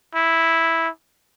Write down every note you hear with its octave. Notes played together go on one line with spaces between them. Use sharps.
E4